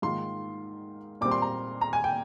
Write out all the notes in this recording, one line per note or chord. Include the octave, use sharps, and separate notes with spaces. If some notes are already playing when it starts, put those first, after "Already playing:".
G#2 D#3 A#3 F4 C6
A#2 G3 C4 D6
C6
A#5
A#5
G#5
G5